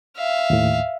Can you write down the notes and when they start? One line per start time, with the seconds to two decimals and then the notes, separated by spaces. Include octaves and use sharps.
0.17 E5 F5
0.50 D#2 A2